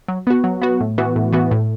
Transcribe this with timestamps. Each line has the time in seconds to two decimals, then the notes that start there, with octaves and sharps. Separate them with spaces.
0.08 F#3
0.27 B3 F#4
0.44 F#3
0.62 B3 F#4
0.80 A2
0.98 E3 B3 F#4
1.16 A2
1.32 E3 B3 F#4
1.51 A2